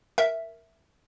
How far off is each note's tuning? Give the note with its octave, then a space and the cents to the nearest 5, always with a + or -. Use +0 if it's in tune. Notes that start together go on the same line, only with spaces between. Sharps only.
A#4 +0 E5 +0